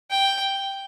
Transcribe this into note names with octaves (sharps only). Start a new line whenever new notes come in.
G5